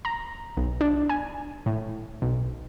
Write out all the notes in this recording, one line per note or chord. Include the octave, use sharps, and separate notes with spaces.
A#5
B1
D4
G#5
A2
B1